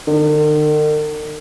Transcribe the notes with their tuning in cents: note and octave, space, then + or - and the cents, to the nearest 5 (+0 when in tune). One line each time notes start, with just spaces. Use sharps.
D#3 -45